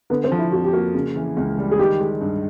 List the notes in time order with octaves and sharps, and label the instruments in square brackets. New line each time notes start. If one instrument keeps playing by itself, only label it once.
[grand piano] D3 [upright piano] B3
[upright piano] C4
[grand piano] F3
[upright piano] E4
[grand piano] F2 [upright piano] F#4
[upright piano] G4
[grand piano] A#3 [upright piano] F#4
[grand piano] C#3
E3
C#2
G3
[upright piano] G#4
[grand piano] D#3 [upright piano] G4
[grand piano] G#3
G2